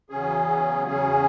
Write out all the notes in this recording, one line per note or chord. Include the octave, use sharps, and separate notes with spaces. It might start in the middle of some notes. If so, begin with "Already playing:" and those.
E2 C#3 F#3 C#4 G#4
E2 C#3 F#3 C#4 G#4